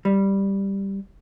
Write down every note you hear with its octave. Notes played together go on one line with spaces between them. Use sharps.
G3